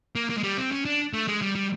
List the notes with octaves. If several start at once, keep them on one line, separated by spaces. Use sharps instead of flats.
A#3
A#3
G#3
G3
C4
C#4
D4
A3
G#3
G3
G3